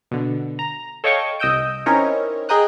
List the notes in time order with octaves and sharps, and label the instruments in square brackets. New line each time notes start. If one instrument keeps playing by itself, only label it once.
[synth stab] B2 D3
A#5
A4 C#5 D#5 F5 G5 C#6
C2 D#5 D#6 E6 G6 D7
C4 C#4 D#4 E4 A#4 C#5
G#4 D#5 G5 A#5 D#6 F#6